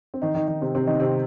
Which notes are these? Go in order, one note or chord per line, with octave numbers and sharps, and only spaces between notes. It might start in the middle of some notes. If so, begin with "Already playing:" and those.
C4
D#3 D#4
D#3 D#4
D#3 D#4
C3 C4
C3 C4
D#3 D#4
C3 C4